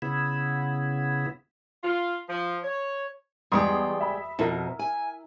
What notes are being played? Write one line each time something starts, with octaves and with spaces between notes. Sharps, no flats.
C#3 B3 E4
F4
F3
C#5
E2 G3 G#3 G5 C6 D#6
E5 B5
F2 B2 E4 A#4 E5
G#5